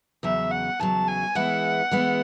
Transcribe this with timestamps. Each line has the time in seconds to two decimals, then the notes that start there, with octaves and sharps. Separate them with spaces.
0.23 E2 C#3 F#3 E5
0.51 F#5
0.80 E2 C#3 F#3 A5
1.08 G#5
1.35 E3 G#3 B3 E4 F#5
1.91 E3 G#3 B3 E4